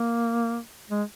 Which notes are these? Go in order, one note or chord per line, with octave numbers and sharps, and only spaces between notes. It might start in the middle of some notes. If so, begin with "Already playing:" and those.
Already playing: A#3
G#3